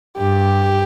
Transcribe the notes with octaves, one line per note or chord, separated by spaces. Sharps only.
G2 G4